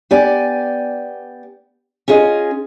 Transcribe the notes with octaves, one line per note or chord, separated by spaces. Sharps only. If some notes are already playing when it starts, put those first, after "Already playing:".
B3 G4 D5 G#5
C#4 F4 G#4 D#5